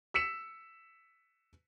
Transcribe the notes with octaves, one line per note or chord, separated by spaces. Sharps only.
E6 B6 C#7 E7